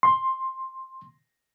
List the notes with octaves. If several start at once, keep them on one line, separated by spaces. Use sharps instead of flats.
C6